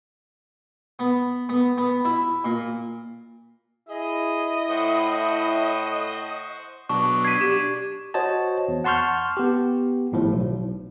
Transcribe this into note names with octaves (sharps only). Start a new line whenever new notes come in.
B3
B3
B3
E4
A#2
E4 G#4 D#5
A2 C5 F#5 C#6
B2 F#3 D4 A5 C#6
G#6 B6 C7 D#7
D4 G4
F#4 C5 C#5 D#5 A5
E2
F#5 A5 C6 C#6 F6 G6
B3 G4
G#1 A2 F3
B1